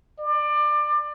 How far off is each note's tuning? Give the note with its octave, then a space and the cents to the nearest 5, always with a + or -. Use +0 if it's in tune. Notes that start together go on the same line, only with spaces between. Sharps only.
D5 +25